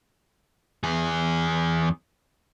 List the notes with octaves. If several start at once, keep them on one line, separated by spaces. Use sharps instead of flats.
E2 G#4